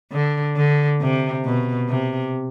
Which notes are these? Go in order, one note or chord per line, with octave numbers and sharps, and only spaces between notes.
D3
D3
C3
B2
C3